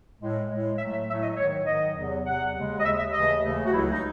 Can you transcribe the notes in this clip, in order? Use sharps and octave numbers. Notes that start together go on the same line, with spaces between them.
A2 G#3
A2 G#3
A2 F#3 A3 E5
E5
A2 F#3 A3 E5
D#5
G#2 D#3 F#3 C#5
G#2 D#3 F#3 D#5
E2 C3 F#3
E2 C3 F#3 F#5
D#2 C#3 G#3
D#5
D#2 C#3 G#3 E5
E5
D#2 C#3 E3 A3 D#5
D#2 C#3 E3 A3
F#4
C#2 C#3 F#3 A3 E4
D#4